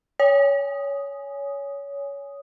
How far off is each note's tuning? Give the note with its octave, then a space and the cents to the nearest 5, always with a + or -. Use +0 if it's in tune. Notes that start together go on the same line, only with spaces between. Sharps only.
C#5 +20 G#5 +0 D#6 +0